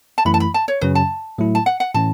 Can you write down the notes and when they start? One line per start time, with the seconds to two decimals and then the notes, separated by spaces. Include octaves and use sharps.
0.18 A5
0.25 F#2 E3 A3 E4 B5
0.34 A5
0.40 B5
0.54 A5
0.68 C#5
0.81 F#2 C#3 F#3 C#4 B4
0.95 A5
1.38 A2 F#3 A3 E4
1.55 A5
1.66 F#5
1.80 F#5
1.94 A2 E3 C#4 A5